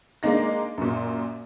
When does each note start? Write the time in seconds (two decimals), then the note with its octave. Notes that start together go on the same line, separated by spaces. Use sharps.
0.23 G#3 A#3 D4 D#4 A#6
0.78 F#2 A#2